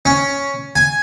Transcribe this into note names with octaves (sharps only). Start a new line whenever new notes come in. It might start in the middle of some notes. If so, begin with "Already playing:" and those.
C#4
G#5